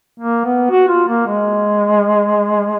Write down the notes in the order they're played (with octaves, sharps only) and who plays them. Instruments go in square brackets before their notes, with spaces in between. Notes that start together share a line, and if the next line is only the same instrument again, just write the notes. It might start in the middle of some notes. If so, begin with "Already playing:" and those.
[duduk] A#3
B3
F#4
F4
A#3
G#3